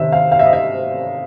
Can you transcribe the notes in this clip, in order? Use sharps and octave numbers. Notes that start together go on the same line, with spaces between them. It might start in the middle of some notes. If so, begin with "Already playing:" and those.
Already playing: C3 D#3 E5
F5
F5
E5
D#5
E5